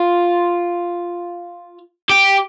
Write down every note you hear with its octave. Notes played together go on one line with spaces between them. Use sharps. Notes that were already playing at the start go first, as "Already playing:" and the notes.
Already playing: F4
G4